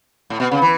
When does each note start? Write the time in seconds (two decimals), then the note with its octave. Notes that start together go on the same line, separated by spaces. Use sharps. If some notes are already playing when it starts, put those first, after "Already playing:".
0.30 A2
0.40 B2
0.51 C#3
0.62 E3